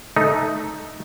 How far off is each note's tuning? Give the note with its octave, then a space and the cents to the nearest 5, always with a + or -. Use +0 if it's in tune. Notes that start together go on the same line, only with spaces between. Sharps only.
A3 -5 D#4 +0